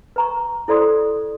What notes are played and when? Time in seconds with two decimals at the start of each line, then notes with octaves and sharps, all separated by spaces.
0.16 B4 A#5 C#6
0.68 E4 A4 C5 D5 C6 D#6